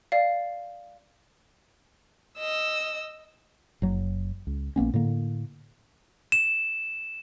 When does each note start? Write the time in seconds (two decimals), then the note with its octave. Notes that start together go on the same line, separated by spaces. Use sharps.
0.12 D5 F5
2.39 D#5 E6
3.82 F#1 F#3
4.47 C#2
4.76 A#1 A#3 B3 C#4
4.94 A2 D3 A#3
6.32 E7